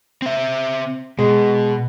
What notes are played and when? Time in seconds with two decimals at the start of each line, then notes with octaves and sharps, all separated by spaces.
0.22 C4 E5
1.19 B2 G#3